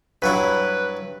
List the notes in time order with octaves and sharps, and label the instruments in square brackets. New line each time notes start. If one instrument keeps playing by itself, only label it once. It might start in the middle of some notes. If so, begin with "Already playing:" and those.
[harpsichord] G2 F#3 E4 [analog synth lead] B4